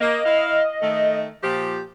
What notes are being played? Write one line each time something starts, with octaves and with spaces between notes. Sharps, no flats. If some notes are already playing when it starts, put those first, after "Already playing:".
A#3 D#5
E4 F5
D#3 A3
A#2 F3 G4